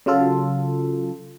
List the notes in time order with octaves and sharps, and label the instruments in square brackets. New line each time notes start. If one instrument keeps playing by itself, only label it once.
[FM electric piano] C#3 F#3 F4 A4